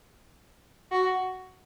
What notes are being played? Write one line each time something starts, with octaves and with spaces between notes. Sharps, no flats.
F#4